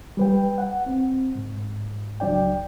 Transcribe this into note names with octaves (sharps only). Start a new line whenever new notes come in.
G3 B4 G5
F#5
C4
G#2
C#2 F#3 D4 D5 G5